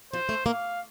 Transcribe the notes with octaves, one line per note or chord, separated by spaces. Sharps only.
F3 C5
A3
A#3 F5